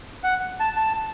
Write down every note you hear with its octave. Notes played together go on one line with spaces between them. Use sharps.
F#5
A5
A5